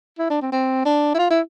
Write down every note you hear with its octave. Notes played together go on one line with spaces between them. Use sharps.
E4
D4
C4
C4
D4
E4
F4
E4